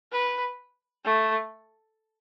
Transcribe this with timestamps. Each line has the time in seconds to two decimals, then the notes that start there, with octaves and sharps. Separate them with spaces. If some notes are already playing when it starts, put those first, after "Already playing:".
0.12 B4
1.05 A3